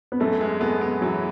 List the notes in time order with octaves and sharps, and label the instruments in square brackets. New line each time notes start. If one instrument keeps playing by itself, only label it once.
[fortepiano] B3
[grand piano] F#2 [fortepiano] A3
[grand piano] G#3
[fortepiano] A3 [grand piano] B3
[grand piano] B3
[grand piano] E3 [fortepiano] F#3